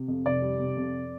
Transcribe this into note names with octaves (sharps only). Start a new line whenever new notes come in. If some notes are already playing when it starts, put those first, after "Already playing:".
Already playing: C3
F2
F1 D5
G3
C3
F2